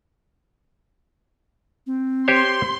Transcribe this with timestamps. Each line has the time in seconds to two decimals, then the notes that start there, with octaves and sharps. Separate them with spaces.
1.86 C4
2.28 G4 C5 C#5 C6